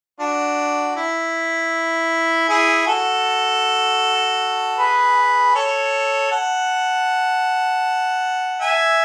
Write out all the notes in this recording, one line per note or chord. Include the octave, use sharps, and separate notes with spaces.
D4 F#4
E4
E4 G#4
F#4 A4
G#4 B4
A4 C#5
F#5 A5
E5 G#5